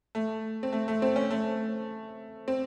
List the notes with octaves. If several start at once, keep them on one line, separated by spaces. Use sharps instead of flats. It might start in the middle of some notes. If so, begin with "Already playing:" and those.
A3
C4
A3
A3
C4
C#4
A3
C4